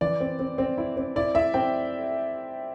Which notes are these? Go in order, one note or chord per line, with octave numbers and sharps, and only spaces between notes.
E3 D5
C4
C4
C4
E4
C4
E4 D5
E4 E5
C4 G5